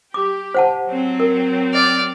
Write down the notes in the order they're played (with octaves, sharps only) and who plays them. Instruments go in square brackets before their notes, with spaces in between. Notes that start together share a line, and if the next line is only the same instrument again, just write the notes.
[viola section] G4 [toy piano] D6
[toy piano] C5 F#5 A5
[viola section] F#3 C4
[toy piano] A#4
[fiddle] D5 F6